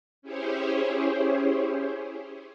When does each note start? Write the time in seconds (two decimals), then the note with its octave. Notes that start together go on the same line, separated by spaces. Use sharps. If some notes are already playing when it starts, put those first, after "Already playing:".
0.22 C#4 E4 G4 G#4 C5 C#5